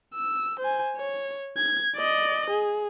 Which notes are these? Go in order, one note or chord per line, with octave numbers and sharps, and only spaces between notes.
E6
C5 G#5
C#5
G#6
D5 D#5
G#4